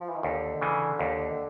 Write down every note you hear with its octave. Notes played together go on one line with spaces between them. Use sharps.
F3
E3
D#3
D#2 D3
C#3 E3
D#2